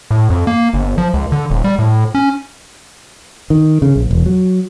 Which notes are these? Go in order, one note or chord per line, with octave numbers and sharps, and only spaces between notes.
A2
F2
A#3
G1
F3
C#2
D3
D#1
G3
A2
C#4
D#3
C#3
A#1
E1
F#3